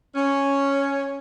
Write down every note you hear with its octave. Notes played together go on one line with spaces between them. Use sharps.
C#4